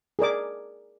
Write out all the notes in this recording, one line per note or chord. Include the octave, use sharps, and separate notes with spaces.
G#4 A#4 D5 D6